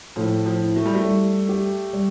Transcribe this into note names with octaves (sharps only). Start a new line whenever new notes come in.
A2 F3
F3
E4
A3
G3
A3
G3
G4
G3